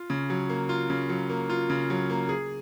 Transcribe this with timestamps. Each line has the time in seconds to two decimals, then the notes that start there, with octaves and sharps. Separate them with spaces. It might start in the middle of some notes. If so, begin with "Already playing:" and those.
Already playing: F4
0.10 C#3
0.30 F#3
0.49 A#3
0.69 F4
0.90 C#3
1.09 F#3
1.30 A#3
1.50 F4
1.70 C#3
1.90 F#3
2.10 A#3
2.29 G#4